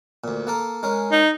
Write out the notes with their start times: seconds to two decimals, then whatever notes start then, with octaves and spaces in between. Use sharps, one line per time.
0.24 D2 A#2
0.47 A#3 A4 A#4
0.83 G#3 C#4 A#4
1.12 D#4